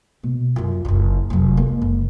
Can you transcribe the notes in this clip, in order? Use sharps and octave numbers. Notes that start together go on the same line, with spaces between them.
B2
F#2 F4
F#1 E2
F1 F#3
G#3 A#3
F#1